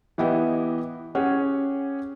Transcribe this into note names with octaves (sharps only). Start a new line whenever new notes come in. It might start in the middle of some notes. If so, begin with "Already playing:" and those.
E3 B3 E4 G4 D#5
C#4 G4 G#4 F#5